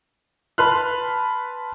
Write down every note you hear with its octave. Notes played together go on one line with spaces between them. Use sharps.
B4 A5 C6 F6 F#6